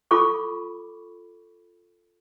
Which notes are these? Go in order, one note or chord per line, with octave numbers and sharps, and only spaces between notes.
F4 A4 B5 C#6 D6